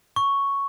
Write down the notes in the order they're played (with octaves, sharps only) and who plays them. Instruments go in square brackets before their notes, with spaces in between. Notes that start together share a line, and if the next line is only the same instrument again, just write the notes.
[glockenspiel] C#6